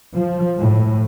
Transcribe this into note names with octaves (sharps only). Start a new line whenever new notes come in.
F3
A2